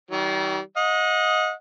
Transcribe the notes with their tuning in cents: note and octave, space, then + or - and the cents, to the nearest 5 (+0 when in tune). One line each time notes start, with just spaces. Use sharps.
D#3 +35 G3 -40
D#5 +10 F#5 -35